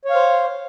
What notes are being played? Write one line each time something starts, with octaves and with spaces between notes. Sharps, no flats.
C5 C#5 F5